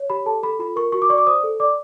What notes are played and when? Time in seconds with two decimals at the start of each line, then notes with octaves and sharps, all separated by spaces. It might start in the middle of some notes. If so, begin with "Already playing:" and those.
Already playing: C#5
0.10 G4 B5
0.26 A4 A5
0.43 A4 B5
0.59 F4 B5
0.76 A#4 C#6
0.92 F#4 C#6
1.02 D6
1.09 D5 C#6
1.18 D6
1.27 C5 D#6
1.44 A4
1.60 D5 D6